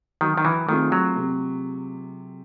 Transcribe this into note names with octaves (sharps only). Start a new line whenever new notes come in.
D#3 F#3
D#3
E3
D#3 A3 C4 F4 G#4
F#3
C3